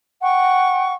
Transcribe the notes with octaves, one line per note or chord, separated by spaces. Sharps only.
F#5 G5 C#6